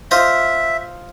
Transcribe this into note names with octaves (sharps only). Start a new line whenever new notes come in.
F4 C5 D#5 E5